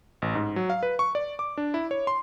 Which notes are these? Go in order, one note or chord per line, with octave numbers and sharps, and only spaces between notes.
A1
G#2
F#3
F5
B4
C#6
D5
D6
D4
E4
C#5
C6